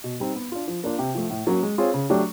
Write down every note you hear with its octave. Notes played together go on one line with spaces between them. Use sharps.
B2
G3 C4 D#4
B3
D4 F4
F3
A#3 D4 F4
C3
F3 A3
A2
F#3 A#3 C#4 F#4
G#3
C4 F4 G#4 C#5
C#3
F#3 A3 D4 G4